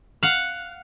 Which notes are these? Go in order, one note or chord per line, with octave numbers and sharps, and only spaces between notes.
F5 F#5